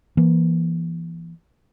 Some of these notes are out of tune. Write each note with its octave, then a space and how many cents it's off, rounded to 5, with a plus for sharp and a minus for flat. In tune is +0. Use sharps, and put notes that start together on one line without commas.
E3 +25 A#3 +35